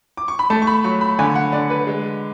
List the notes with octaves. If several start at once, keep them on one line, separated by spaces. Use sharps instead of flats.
D6
C#6
B5
A3 A5
C#6
B5
F#3 C#6
B5
D3 G#5
F#5
D3 D5
B4
G#3